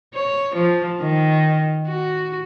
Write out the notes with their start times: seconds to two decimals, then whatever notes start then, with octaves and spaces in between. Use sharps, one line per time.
0.14 C#5
0.56 F3
1.00 D#3
1.88 F#4